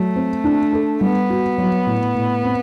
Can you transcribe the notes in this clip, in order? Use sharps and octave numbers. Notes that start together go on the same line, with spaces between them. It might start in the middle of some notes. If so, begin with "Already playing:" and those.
Already playing: F#3 A3
C4
D4
A4
G3 B3
F#4
F#3
A2
A2
C4